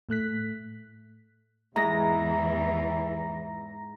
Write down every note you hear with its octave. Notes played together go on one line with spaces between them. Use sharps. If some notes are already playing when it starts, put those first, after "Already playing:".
A2 A3 F#6 B6
E2 G#2 E3 E4 A#5 A#6